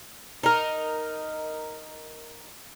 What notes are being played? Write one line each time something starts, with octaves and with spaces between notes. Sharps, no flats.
D#4 A#4